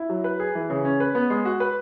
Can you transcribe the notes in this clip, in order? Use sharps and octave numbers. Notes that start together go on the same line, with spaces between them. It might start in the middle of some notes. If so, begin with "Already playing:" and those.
Already playing: E4
F#3
B4
G#4
E3
C#3
C#4
B4
B3
G#3
F#4
B4